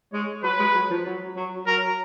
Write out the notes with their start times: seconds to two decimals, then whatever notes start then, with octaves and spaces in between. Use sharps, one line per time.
0.13 G#3 C#5
0.44 F#3 B4
0.60 G#3
0.75 F#3
0.90 F3
1.06 F#3
1.36 F#3
1.67 F#3 A#4